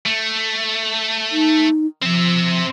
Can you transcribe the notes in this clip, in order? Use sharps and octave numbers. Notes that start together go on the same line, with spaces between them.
A3
D#4
F3 C4 E5